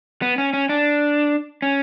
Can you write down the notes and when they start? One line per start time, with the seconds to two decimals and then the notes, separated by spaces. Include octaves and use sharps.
0.22 B3
0.38 C#4
0.53 C#4
0.69 D4
1.62 C#4